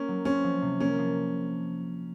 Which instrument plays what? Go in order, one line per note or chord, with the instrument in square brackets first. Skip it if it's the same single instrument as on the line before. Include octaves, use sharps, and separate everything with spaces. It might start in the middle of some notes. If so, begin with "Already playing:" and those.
Already playing: [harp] A#3 [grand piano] C#4
[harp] F#3
[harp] C4 [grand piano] C#4
[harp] F3
C3
[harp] A#3 [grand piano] C#4
[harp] F3